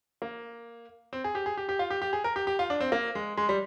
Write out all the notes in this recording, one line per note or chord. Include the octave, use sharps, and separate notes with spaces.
A#3
C4
G#4
G4
G#4
G4
G4
F4
G4
G4
G#4
A#4
G4
G4
F4
D4
C4
A#3
G#3
G#3
G3